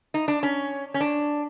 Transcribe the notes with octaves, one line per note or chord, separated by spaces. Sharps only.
D#4
D4
C#4
C#4
D4